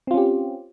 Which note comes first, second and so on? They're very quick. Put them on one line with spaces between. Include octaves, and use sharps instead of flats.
C4 F4 C#4 G4